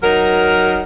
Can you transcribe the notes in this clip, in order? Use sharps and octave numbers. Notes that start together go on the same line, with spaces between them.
F#3 D#4 A#4